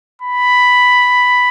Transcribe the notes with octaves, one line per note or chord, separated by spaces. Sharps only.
B5